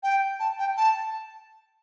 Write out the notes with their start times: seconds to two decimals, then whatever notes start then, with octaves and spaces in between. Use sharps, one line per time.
0.03 G5
0.40 A5
0.59 G5
0.77 A5